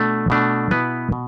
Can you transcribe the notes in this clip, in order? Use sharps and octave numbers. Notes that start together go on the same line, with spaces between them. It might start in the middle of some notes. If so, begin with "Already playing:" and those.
Already playing: B2 A3 D4
B2 A3 D4
B2 B3 E4 B4
B2